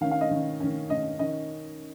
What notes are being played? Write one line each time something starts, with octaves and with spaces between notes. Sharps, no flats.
D#3 C#4 F5
F5
D#5
D#3 C#4
D#3 C#4
D#3 C#4 D#5
D#3 C#4 D#5